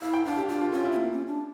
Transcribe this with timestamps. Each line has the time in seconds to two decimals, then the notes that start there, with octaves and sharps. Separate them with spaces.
0.02 E4 F5
0.14 G5
0.25 D4 F5
0.37 G4
0.49 D4 F4
0.61 F4
0.72 C#4 F4
0.84 E4
0.92 C#4
0.96 A#3
1.12 C#4
1.27 D4